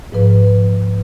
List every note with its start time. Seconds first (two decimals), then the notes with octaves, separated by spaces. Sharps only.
0.12 G#2 F3 B4